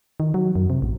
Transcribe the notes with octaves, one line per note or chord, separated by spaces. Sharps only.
D#3
F#3
F#2
C3
A1